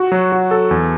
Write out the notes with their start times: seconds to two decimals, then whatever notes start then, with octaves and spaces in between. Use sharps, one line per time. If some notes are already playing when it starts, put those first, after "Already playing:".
Already playing: F#4
0.12 F#3
0.32 F#4
0.51 A4
0.71 E2